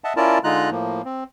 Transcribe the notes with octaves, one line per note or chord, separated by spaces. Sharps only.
D#5 E5 F#5 A5
C#4 E4 F4 A#4 D5 A5
D3 G#3 D#4 F4 A#5 F#6
A2 F3 A#3
C4